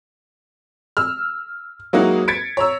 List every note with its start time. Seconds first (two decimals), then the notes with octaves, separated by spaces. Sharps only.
0.97 E6 F6
1.93 F#3 G#3 A#3 D#4 E4 F#4
2.28 G#6 A6 B6 C#7 D7
2.57 C#5 A#5 E6